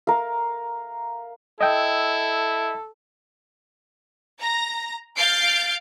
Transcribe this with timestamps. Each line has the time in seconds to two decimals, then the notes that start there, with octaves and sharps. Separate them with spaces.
0.07 A#4 F5
1.61 E4 A4 D#5 G5
4.40 A#5 A#6
5.16 F5 F6 G6 A6 C7 D7